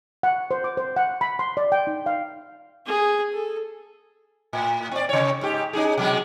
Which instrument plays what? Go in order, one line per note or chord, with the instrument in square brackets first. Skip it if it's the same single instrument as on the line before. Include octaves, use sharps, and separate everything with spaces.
[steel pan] F#5
C5
D6
C5
F#5
B5
C6
D5
G5
D#4
F5
[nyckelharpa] G#4
A4
[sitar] A2
C4 D5
C3 C#5
G#2 G4
C#4 D#4 G#4
B2 F#3 G#3